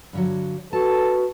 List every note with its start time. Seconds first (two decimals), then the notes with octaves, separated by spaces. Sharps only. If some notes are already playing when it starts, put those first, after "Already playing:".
0.13 G2 D3 F#3
0.73 F#4 A4 B4 A5